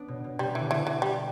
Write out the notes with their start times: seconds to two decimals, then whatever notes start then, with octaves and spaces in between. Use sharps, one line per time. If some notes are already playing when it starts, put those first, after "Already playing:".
Already playing: B3 D4
0.08 B2
0.24 B2
0.39 B2 G3
0.55 E3
0.60 D3
0.71 E3
0.81 B2
0.87 E3
1.02 G3